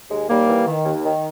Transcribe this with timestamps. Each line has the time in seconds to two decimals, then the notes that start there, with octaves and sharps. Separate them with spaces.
0.10 D#2 G#3
0.29 D#2 G3 A#3
0.48 E3
0.66 D#3
0.85 D#2
1.04 D#3